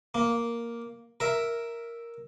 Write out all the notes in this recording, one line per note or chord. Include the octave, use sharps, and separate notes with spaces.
A#3
A#4 E5